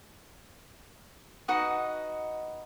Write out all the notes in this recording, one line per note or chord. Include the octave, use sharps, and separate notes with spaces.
D#4 F#4 B4 D#5